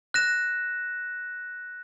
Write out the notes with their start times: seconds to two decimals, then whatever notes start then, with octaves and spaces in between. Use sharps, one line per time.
0.14 F#6 A#6 E7